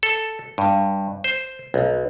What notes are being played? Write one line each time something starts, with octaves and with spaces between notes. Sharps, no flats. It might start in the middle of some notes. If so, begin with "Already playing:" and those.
A4
G2
C5
B1